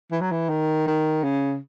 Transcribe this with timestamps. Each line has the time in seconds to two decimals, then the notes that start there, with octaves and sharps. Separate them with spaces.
0.12 E3
0.21 F#3
0.31 E3
0.50 D#3
0.87 D#3
1.24 C#3